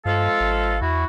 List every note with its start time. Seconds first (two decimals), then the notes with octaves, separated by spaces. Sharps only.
0.05 G2 F3 G#3 A4 F5
0.40 G#1
0.81 E2 E4 F#4